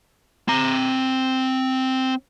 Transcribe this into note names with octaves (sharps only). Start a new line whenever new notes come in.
C4 A#5